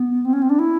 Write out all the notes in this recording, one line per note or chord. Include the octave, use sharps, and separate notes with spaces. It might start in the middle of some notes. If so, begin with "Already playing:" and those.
Already playing: B3
C4
C#4
C4
D4
E4